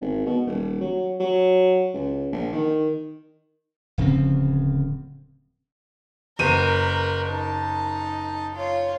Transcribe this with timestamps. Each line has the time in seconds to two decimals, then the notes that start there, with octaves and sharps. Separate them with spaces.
0.01 G#1
0.26 B2
0.47 D#1
0.81 F#3
1.20 F#3
1.94 C#2
2.32 A#1
2.53 D#3
3.98 D1 C#3 F3 C4
6.39 F#1 A#4 B4 D#7
7.26 D#4 A5
8.55 F4 C#5